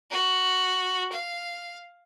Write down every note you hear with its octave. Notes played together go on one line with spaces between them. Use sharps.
F#4
F5